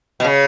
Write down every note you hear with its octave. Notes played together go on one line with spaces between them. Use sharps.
B2
C#3